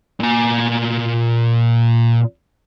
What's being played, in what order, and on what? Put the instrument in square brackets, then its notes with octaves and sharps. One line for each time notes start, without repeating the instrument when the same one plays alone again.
[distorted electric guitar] A#2 G#5